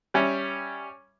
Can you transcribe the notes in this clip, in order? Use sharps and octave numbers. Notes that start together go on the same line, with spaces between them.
G3 C#4 E5